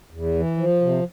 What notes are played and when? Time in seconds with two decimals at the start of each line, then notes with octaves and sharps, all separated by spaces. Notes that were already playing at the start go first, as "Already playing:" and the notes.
0.11 E2
0.34 E3
0.57 F3
0.81 C3